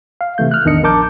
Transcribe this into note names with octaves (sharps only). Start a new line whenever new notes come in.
F5
C3 E3 A3 G6
F6 F#6
A1 E2 D#3 D4 D#5 C#7
A#1 D4 A#4 A5 D6 G6